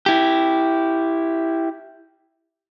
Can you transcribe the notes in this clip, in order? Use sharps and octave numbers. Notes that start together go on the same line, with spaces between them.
E4 G4